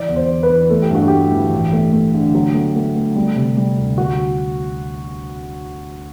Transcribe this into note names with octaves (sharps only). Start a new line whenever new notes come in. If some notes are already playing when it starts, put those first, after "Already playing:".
Already playing: E3 D5
E2
C5
E3
B4
E3
A3 A4
G4
G2 F#4
A3 G4
E3
A1
A3
A3
D3
F#3
A3
A3
A3
G3
C3
G3
D2
F#4